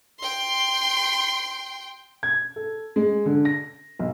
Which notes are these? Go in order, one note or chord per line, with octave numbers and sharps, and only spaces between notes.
G5 C6
G#6
A4
G#3
D3
A#6
B1